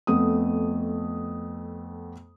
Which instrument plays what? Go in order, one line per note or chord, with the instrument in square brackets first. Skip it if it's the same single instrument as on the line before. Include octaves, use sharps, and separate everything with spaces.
[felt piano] F2 A3 B3 D#6